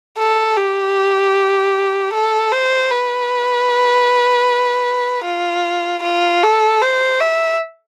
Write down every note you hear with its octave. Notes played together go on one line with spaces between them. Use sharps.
A4
G4
A4
C5
B4
F4
F4
A4
C5
E5